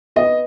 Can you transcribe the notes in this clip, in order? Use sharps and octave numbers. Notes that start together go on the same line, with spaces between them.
B3 D#5